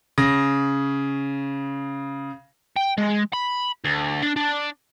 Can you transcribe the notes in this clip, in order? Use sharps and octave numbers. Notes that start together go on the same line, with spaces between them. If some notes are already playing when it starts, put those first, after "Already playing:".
C#3 A#6
G5
G#3
B5
D2
D4
D4